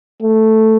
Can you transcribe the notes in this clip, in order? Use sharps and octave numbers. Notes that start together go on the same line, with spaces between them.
A3